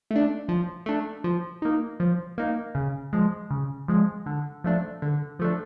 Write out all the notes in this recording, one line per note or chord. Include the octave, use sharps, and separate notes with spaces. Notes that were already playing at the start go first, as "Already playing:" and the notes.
A3
D4
F3
A3 D4
F3
A#3 D#4
F3
A#3 D#4
C#3
F3 G#3
C#3
F3 G#3
D3
F3 A3 D4
D3
F3 A3 D4